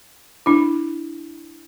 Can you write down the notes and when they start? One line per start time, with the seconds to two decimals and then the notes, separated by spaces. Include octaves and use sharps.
0.46 D4 E4